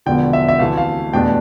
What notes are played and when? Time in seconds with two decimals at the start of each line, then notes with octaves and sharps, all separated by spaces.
0.06 E1 E2 D3 F3 G5
0.33 E5
0.48 E5
0.59 D2 C3 E3 A3 F5
0.77 F5
1.13 F1 E2 B2 A3 D4 G5